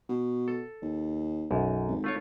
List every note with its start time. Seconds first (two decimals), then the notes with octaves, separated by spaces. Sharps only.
0.09 B2
0.48 A4
0.82 D#2
1.51 B1 F#2
1.87 G#1
2.04 A3 F4 C#5